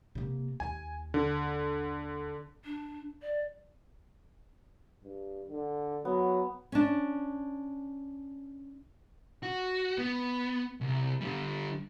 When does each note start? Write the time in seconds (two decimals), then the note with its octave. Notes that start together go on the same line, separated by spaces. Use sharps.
0.15 C3 A#3
0.60 D#2 G#5
1.14 D3
2.64 D4
3.22 D5
5.04 G2
5.49 D3
6.05 F#3 B3
6.72 C#4 D4
9.43 F#4
9.98 B3
10.81 C2
11.21 D3 G3